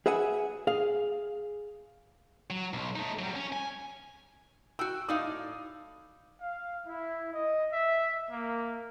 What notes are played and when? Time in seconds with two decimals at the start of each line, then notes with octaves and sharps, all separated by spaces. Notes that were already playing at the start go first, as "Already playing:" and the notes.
0.06 G#4 B4 E5 F#5 G#5
0.67 G#4 F5
2.50 F#3
2.74 B1
2.96 A3 D#4
3.19 F#3 G3
3.36 C#4
3.53 G#5
4.79 F#4 G5 E6
5.09 A2 D#4 D5 F5 D#6
6.41 F5
6.87 E4
7.34 D#5
7.73 E5
8.30 A#3